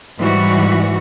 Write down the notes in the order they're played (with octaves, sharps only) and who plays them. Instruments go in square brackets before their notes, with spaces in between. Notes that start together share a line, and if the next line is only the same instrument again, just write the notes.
[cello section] G#2 E3 G3 F#4